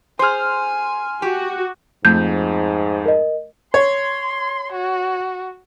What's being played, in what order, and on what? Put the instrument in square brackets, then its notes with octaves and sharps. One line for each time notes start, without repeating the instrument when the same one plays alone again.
[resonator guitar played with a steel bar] G#4 C5 [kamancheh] G#5 [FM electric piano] C6 F6
[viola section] F#4 [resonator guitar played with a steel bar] G4
[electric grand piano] F2 F3 [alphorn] G#2 [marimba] A3 G6
[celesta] A#4 D#5
[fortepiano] C#5 [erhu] C6
[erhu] F#4